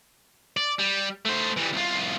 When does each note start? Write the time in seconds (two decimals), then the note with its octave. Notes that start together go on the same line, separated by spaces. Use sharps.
0.57 D5
0.79 G3
1.25 A3 C5
1.57 E3 G3
1.73 C2 F4